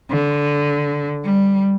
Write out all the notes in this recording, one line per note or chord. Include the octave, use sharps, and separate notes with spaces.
D3
G3